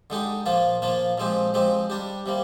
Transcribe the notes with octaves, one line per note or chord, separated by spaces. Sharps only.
D3 G#3 D#4 G4
A#2 F3 A#3 F4
A#2 F3 A#3 F4
A#2 F3 G#3 C4 G4
F3 G#3 C4 G4
G3 D4 G4
C3 G3 A#3